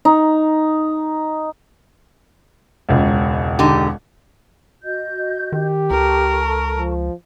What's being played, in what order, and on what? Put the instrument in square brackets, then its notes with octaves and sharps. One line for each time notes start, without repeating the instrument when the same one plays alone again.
[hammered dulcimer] D#4
[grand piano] E1 C#2
[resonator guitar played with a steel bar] D3 D#4 G4
[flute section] F#4 D#5 G6
[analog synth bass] D#3 [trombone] G4
[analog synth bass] C#2 [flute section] A4 A5 C#6 [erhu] A#4
[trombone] F3